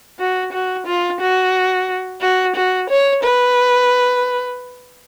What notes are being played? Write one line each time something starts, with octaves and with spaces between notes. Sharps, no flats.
F#4
F#4
F4
F#4
F#4
F#4
C#5
B4